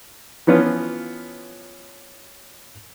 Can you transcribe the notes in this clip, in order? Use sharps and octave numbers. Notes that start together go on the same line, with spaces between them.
E3 F3 B3 C#4 F4